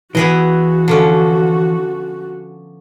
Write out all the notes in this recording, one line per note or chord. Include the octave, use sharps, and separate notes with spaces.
E3 B3 F#4 G#4 D#5
D3 F3 C#4